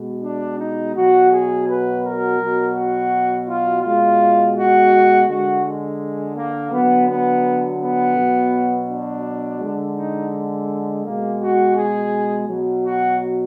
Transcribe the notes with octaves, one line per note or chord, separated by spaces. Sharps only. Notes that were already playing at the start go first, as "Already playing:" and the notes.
Already playing: B2 G#3
D4
D#4
B2 F#3 F#4
G#4
B4
A#4
B2 F#3
F#4
F4
B2 G#3 F4
F#4
D3 G#3 F#4
G#3
A#3
D3 F#3 B3
B3
B3
B2 F#3
D4
D3 G#3
D#4
B2 G#3 A#3
F#4
G#4
B2 F#3
F#4